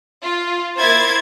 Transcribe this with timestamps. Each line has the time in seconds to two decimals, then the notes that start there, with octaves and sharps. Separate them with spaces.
0.22 F4
0.79 A#3 E4 C5 G#6 A6